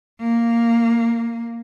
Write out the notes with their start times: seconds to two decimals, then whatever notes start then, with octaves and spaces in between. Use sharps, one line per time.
0.20 A#3